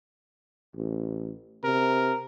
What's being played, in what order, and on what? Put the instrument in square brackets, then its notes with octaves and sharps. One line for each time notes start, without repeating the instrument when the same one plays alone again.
[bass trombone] A1
[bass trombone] C3 [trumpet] A#4